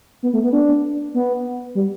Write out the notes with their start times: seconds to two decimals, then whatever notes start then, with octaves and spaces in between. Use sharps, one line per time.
0.23 B3
0.33 A3
0.44 B3
0.53 D4
1.14 B3
1.75 G3